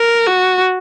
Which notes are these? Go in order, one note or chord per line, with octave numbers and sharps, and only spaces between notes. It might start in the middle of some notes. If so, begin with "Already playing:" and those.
Already playing: A#4
F#4